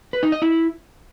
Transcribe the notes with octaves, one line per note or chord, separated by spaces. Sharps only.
B4
D#4
D#5
E4